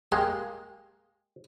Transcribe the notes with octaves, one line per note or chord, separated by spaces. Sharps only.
G#3 A#3 G4 G#4 C6